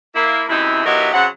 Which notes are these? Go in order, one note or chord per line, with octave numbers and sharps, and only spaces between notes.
A#3 E4
F#2 C3 E3 D#4 E4
F#3 B3 D#4 E4 G4 A#4
C#3 F#3 C4 F#5